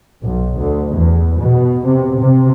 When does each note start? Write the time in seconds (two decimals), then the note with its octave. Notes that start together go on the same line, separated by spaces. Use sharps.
0.22 B1
0.57 D2
0.95 E2
1.39 B2
1.85 C3
2.18 C3